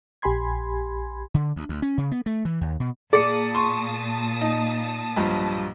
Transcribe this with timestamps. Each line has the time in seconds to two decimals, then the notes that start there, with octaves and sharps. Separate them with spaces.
0.22 A#1 G4 G#5 B5 C6 G#6
1.34 D3
1.56 D2
1.69 D2
1.82 C#4
1.98 C#3
2.11 B3
2.26 A3
2.45 E3
2.61 D#2
2.80 B2
3.13 A#2 G#4 D5 A5 D#6 C#7
3.55 C6 C#6
4.41 D#4
5.16 B1 G2 F3